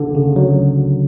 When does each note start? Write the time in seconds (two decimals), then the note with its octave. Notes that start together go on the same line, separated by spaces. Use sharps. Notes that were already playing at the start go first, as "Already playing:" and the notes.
Already playing: D3
0.15 C#3
0.36 F#3